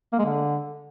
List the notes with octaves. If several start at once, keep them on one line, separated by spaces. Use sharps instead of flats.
A#3
G#3
D3